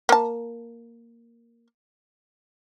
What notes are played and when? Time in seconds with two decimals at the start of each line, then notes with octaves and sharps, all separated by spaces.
0.09 A#3 A5